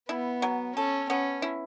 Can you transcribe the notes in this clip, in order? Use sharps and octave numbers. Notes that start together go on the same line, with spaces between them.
B3 E4
F#3
C#4 A4
B3 C#4
E4